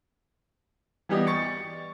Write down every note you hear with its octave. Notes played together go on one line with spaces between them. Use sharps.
E3 G3 B3 G4 D5 D#5
C#6 A6 C#7